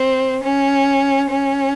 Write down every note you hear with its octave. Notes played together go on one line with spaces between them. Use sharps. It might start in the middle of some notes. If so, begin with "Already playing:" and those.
Already playing: C4
C#4
C#4